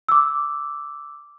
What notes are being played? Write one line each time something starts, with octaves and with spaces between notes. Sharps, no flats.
D6 E6